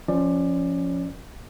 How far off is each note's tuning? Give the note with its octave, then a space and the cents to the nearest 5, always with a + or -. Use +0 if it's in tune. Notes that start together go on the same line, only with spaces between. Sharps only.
F3 -5 C#4 +0 D5 +20